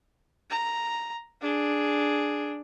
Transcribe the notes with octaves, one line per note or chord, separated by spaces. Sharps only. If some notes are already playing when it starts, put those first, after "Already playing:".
A#5
D4 G#4